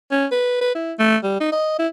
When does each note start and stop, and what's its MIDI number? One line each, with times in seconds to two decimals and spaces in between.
0.11 0.26 61
0.31 0.60 71
0.61 0.73 71
0.75 0.93 64
0.99 1.17 57
1.23 1.40 55
1.40 1.51 63
1.52 1.75 75
1.78 1.87 64